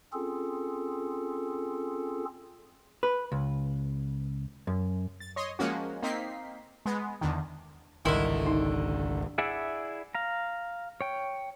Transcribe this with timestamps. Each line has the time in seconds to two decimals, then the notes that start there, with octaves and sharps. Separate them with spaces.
0.13 C4 C#4 F4 G#4 A4
3.03 B4
3.32 C#2
4.67 F#2
5.20 A6
5.36 C#5 D#5 C6
5.59 F3 G#3 A#3 C#4 F#4
6.02 A#3 C4 D#4 B6 C7
6.86 G#3 B3
7.21 E2 D3 D#3
8.05 G#1 C#2 D3 D#3 E4 E5 C6
8.46 D#4
9.38 E4 G#4 D5 E5 F#5
10.15 F5 A#5
11.01 C#5 G5